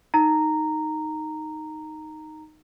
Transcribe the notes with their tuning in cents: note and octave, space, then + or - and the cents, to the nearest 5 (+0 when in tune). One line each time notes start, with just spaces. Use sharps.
D#4 +0 A#5 -10